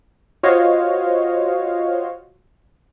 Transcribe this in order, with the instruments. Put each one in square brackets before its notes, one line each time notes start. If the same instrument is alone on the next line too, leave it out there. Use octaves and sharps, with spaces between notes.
[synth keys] F4 F#4 C5 C#5 D#5 F5